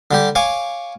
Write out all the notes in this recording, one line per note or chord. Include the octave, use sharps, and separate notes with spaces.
D3 G3 G4
C#5 F5 G#5 D6